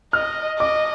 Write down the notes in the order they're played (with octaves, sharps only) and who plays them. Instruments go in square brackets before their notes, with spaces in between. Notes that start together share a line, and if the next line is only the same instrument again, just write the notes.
[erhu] D#5 [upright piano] F6
[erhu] D#5 [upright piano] D6